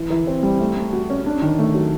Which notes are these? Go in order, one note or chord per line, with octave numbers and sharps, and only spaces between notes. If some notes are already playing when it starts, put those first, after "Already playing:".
Already playing: E3 E4
E3
C4
G3
A3
A3
F#4
C#4
D4
D#3
A3
F#3